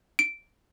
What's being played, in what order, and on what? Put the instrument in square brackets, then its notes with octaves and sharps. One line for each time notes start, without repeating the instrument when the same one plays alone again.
[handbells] D7